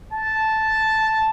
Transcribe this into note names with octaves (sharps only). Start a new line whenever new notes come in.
A5